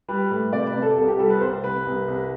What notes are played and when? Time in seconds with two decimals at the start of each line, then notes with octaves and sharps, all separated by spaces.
0.08 G3 B4
0.31 A2
0.53 C3 D5
0.67 B4
0.75 C3
0.82 A4
0.97 C2 A4
1.08 G4
1.19 G3 A4
1.30 B4
1.41 C2 C5
1.64 C3 B4
1.86 C2
2.08 C2